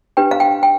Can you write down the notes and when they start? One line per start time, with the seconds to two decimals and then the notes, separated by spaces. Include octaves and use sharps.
0.17 D4 G4 B4 G5
0.31 F5
0.40 G5
0.63 G5